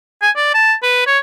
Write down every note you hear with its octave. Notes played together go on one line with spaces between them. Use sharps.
G#5
D5
A5
B4
C#5